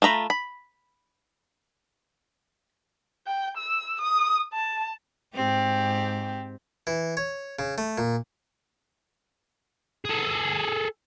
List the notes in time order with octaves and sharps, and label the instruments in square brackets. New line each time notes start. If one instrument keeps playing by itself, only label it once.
[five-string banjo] A3 F4 A#5 B5
B5
[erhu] G5
E6
D#6
A5
[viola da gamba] G#2 C4 G4
[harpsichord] E3
C#5
C#3
A3
A#2
[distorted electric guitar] G#4 A4